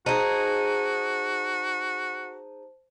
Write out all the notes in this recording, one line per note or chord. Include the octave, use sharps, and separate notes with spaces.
D#4 F#4 G#4 C5 A5